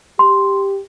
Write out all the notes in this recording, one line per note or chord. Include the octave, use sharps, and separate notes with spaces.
G4 C6